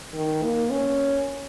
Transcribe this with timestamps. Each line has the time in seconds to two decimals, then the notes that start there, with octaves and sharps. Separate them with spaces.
0.14 D#3
0.43 A#3
0.71 C#4